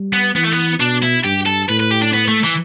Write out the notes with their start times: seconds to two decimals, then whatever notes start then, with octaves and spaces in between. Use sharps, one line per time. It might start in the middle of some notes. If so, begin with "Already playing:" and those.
Already playing: G3
0.13 B3
0.35 E3 B3
0.44 A3
0.52 B3
0.79 B2 D4
1.03 E4
1.24 G2 G4
1.46 A4
1.69 A2 B4
1.80 B4
1.91 G4
2.02 D4
2.14 B3
2.28 A3
2.44 E3